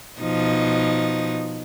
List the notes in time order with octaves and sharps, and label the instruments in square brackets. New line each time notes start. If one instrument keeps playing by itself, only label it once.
[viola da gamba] B2 F3 D#4